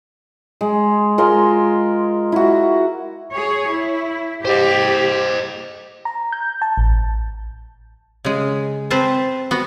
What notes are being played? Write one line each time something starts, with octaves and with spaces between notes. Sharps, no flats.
G#3
G#3 F4 A#4 C6
E4 F#4
G#4 C#5
E4
G4 C5 D#5
A#5
G6
A5
A1
C#3 G#3
C4 B4 C5 A5
B3 F#4